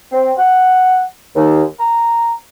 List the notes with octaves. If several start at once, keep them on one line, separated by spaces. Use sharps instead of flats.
C4
F#5
D#2
A#5